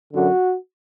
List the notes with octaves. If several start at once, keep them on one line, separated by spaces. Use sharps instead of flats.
F#2 D3 F#3 F#4